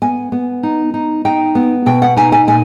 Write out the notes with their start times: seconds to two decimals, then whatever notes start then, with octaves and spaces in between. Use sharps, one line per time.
0.02 B3 G#5
0.32 B3
0.63 D#4
0.94 D#4
1.25 D#4 G5
1.55 B3
1.86 B2 G5
2.02 F#5
2.16 D#4 G#5
2.32 G#5
2.47 A#2 G#5